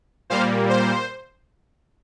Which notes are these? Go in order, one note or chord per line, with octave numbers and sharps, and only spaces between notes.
A#2 G3 A#3 C5 F5
C5